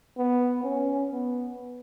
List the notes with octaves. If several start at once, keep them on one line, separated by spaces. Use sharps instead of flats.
B3
C#4
B3